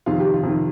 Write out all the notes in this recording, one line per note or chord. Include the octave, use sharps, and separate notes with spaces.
F2 C3 D#3 F4
G4
F4
F2 C3 D#3